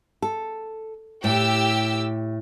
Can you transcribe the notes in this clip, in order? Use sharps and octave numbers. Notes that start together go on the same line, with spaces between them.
A4
A2 G4 E6